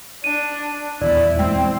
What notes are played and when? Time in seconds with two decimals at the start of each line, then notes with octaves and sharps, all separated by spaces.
0.24 D4 D#7
1.01 D#1 E2 E4 D5
1.39 G#3 C4 G5 E6